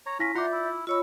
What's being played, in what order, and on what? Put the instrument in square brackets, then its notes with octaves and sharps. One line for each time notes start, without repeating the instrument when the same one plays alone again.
[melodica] C#5 A#5
[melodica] C#4 F4 [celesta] E4 A#6 B6
[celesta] F4 D6 [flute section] D5 E5 G6 [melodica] F#5 A#5 C6
[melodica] E4
[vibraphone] F4 C#5 B5 [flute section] D#5 C#6 E6